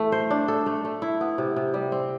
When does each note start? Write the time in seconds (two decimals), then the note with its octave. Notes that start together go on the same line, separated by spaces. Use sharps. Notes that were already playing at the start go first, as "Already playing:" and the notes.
Already playing: E3 A3 A4
0.12 C5
0.31 D4
0.48 A4
0.66 A3
0.85 A3
1.02 E4
1.21 B3
1.38 C3
1.56 C3
1.74 G3
1.92 C4